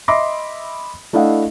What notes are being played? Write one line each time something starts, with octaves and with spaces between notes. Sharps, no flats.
D#5 E5 B5 C6 D6 A#6
A3 D4 E4 D#5 F5 F#5